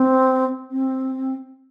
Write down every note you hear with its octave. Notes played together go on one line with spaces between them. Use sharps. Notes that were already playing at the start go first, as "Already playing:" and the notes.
Already playing: C4
C4